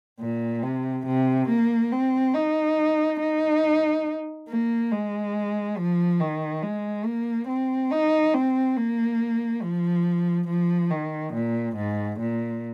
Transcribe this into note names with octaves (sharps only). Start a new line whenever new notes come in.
A#2
C3
C3
A#3
C4
D#4
D#4
A#3
G#3
F3
D#3
G#3
A#3
C4
D#4
C4
A#3
F3
F3
D#3
A#2
G#2
A#2